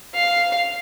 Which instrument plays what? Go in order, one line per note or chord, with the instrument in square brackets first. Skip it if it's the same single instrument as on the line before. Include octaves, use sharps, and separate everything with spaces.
[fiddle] F5